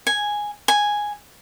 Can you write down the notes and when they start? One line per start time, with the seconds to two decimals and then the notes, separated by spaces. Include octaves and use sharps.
0.07 G#5
0.68 G#5